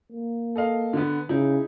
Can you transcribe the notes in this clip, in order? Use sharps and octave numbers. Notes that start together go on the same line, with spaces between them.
A#3
A4 D#5 F5
D3 B3
C#3 D#4 E4